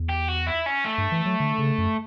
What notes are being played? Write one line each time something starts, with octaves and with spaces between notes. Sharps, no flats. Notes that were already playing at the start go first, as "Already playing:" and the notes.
Already playing: E2
G4
F#4
E4
C#4
A3
G2
E3
F#3
D3
C#3
F#2